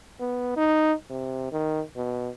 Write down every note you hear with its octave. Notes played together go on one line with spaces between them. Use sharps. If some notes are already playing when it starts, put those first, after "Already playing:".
B3
D#4
C3
D#3
B2